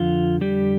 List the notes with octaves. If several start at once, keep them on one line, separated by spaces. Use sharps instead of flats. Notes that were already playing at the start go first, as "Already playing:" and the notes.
Already playing: F2 D3 F3 F4
G3 G4